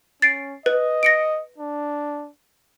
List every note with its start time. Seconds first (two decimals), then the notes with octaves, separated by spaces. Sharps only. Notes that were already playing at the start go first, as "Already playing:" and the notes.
0.22 C#4 A6 C7 D7
0.66 B4 D#5
1.03 A#6 C#7 D7
1.58 D4